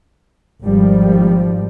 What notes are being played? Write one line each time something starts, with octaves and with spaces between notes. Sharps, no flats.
G#1 F3 G3